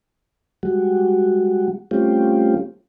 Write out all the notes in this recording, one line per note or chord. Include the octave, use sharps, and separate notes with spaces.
G3 G#3 F#4
G3 A3 C4 C#4 F4 G4